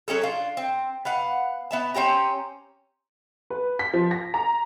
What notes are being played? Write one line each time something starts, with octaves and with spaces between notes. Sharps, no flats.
F#3 C#4 G#4 A4
D4 F4
C4
B3 F5 F#5
B3 E5 A5
C4 C#4 G4 A#5
B4
B6
F3
A#6
A#5